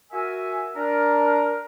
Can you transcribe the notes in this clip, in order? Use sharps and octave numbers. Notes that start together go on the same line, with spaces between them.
F#4 A#4 E5 G#5
D4 A#4